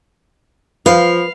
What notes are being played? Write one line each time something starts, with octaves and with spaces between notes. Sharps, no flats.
F3 B4 F5